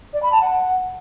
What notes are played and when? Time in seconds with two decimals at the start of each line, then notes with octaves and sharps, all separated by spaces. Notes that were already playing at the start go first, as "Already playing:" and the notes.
0.13 D5
0.23 B5
0.32 A5
0.41 F#5